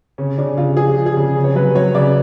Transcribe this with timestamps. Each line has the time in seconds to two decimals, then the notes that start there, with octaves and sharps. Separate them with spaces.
0.18 C#3 C#4
0.38 C#3 D4
0.57 C#3 F4
0.77 F3 G#4
0.97 F3
1.06 G#4
1.16 C#3
1.36 C#3
1.44 C#5
1.55 F#3 B4
1.75 F#3 C#5
1.95 C#3 D5